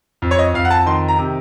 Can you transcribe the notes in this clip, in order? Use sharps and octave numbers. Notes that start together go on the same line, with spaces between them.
F2
C#5
D#5
F2 F5
F#5
A5
D#3 C6
A#5
C3